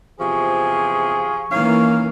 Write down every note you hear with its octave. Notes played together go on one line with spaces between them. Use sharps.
E2 C3 F3 G#4 C#6
D#3 E3 A#3 C#4 F5